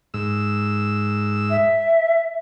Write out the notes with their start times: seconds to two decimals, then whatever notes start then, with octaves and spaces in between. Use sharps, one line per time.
0.14 G#2 E6
1.50 E5